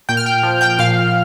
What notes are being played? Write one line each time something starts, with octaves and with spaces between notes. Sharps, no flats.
A#2 G5 G6
F6
G5 G6
F3
G5 G6
A#2 F5 F6